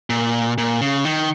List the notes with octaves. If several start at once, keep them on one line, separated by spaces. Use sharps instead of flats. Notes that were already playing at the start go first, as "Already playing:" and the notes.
A#2
A#2
C#3
D#3